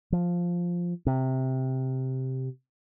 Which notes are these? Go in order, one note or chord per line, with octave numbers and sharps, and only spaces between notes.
F3
C3